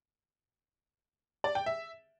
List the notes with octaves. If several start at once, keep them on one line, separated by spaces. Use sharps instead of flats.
D5
G5
E5